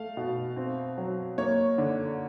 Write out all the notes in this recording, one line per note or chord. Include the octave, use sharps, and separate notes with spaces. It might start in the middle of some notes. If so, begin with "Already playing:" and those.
Already playing: A3 F5
B2
C4
F#3
A#3 C#5
D3